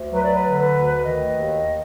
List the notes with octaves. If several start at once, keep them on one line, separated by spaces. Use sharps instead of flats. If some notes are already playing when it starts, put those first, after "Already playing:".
Already playing: D2
F#3 B4
D5
B4
D3
B4
D2
D#3 D#5
D#2